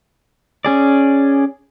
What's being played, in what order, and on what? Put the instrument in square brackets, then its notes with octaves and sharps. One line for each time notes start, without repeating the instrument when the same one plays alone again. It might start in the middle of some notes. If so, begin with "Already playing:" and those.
[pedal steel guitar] C#4 G#4 D5